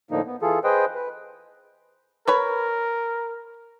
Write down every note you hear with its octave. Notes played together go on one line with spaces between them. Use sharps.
A2 D3 F3 A#3 D#4
B3
E3 F4 G#4 A4
G#4 B4 C5 D#5 G5
B4
A#4 B4 C#5 B5